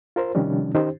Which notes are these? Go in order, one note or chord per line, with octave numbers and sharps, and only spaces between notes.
F4 A#4 C5
C3 D#3 F3 G3 C#4 D4
D#3 C#4 D#4 G4 C5